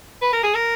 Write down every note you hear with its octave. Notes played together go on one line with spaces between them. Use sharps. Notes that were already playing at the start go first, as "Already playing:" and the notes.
B4
A#4
G#4
A#4